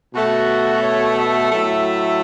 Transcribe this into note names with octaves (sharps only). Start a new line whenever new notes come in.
B2 A3 F#4
C#5
E5
A2 F#3 A3